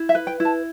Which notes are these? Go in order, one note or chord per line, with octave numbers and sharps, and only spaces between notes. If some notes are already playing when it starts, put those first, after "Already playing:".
Already playing: E4
E5
B4
G5
E4
A5